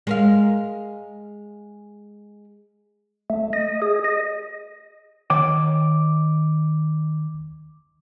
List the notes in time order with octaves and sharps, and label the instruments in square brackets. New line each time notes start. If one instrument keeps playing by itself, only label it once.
[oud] G#3 A#4 F5
[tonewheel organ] A3
D#5
G#4
D#5
[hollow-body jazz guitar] D#3 C#5 G5 [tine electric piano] D6